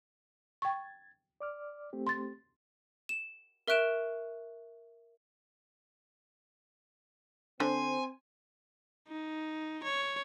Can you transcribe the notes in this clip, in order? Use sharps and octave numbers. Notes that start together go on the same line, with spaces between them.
G5 C#6 G#6 A6
D5 D6 F6
A3 C4 G4
C6 A6
E7
A#4 E5 C#6 F#6 D7 E7
D3 C4 C5 G#5
D#4
C#5